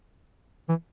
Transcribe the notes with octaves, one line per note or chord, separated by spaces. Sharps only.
E3